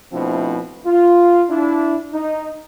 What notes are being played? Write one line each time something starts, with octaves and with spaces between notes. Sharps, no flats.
B2 F3 A3 C4 D4 E4
F4
D4 E4
D#4